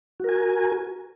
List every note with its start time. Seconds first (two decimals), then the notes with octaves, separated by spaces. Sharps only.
0.20 F#4
0.24 A#4
0.29 G#5